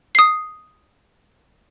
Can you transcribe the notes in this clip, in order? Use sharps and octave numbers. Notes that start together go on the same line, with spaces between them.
D#6 C7